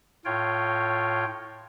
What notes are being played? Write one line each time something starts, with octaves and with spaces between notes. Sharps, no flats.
A2 F4 C#5 G5